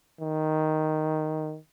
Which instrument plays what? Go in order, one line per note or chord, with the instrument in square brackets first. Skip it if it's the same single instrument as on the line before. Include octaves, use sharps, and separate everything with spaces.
[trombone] D#3